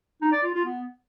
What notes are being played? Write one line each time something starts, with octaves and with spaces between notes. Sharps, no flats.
D#4
D5
F4
F4
B3